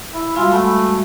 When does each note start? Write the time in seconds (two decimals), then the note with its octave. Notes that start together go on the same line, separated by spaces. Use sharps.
0.13 E4
0.36 G3 G#3 F4 F#4 F5 G#5 E6
0.52 A3 F#5 G#5 B5